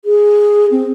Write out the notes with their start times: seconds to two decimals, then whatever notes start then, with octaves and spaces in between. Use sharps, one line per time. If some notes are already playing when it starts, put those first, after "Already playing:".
0.05 G#4
0.71 C4